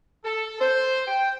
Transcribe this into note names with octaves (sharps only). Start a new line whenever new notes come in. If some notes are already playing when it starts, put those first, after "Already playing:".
A4
C5
G5